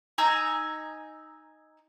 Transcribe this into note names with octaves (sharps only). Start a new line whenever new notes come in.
D#4 G#5 A#5 E6